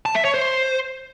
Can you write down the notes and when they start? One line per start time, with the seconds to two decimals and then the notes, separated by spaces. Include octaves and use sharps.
0.06 A5
0.15 E5
0.25 C#5
0.34 C5